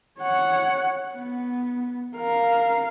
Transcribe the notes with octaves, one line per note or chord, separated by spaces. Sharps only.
C#5 F#5
B3
A#4 F5